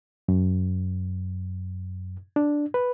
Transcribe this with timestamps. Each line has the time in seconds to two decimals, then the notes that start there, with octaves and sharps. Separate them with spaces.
0.28 F#2
2.36 D4
2.74 B4